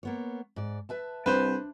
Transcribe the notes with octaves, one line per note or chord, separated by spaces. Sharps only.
A#3 B3 C#5
G#2 D5
B4 E5 A5
C2 D4 B4 C5